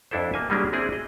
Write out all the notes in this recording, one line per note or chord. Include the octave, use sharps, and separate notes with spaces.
F2 D4 E4 A4 C5
A#3 G#5
G3 G#3 A#3 C#4 D4 F#4
C4 D4 E4 G#4
D#5